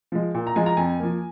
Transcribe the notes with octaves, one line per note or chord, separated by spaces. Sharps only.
F3 G#3
A#2
A#5
F3 G#3 G#5
A#5
F2 G#5
F3 A#3